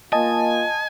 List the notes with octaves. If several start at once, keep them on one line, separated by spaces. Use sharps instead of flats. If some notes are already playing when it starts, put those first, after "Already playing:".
A#3 F4 D#5 G#5 A5